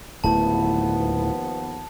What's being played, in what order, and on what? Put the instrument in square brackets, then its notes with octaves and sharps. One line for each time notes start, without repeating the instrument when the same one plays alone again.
[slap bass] D1 A3 [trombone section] D#2 F3 B3 [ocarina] E4 [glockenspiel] A5